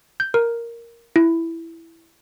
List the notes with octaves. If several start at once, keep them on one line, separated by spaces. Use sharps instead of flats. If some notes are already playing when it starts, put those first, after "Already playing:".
G6
A#4
E4